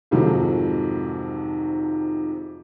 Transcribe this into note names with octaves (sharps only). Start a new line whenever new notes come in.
F2 G#2 C3 D#3 F3 F#3